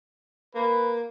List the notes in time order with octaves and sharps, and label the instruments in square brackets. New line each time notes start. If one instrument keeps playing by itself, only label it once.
[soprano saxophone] A#3 [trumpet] B4